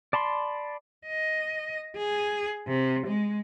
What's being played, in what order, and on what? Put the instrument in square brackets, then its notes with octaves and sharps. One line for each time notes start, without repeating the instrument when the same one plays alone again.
[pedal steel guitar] D5 A5 B5 C6
[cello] D#5
G#4
C3
G#3